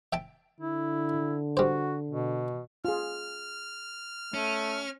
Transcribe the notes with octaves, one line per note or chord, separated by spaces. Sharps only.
E5 G5 A5
D3 E4
G3 F#4 C5
B2
F4 G#4 F6
A3 C#4